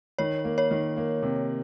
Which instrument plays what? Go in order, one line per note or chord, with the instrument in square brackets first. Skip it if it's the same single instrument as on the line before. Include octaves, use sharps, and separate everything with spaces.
[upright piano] D#3 [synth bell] C#5
[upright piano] A#3
[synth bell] C#5
[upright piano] D#3
A#3
C3